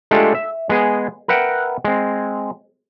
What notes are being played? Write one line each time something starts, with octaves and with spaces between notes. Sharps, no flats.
G#3 A3 D4 F4 G4 A4
E5
G#3 B3 G#4
A#4 B4 E5 F#5 G5
G#3 C4